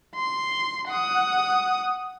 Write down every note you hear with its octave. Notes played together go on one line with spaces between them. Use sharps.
C6
F#5 D#6